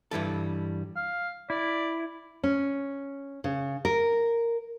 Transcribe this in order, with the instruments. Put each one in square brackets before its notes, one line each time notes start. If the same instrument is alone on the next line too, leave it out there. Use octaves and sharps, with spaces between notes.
[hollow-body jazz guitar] G2 E3 G3 A4
[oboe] F5
[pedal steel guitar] E4 [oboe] D5
[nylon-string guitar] C#4
C#3
A#4